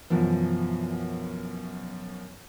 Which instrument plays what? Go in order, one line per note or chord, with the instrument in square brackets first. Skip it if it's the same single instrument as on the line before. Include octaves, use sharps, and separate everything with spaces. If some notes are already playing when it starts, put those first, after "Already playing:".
[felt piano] F#2 B2 E3 F3